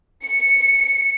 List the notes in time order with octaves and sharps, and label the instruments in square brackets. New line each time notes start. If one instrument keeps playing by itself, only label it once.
[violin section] C#7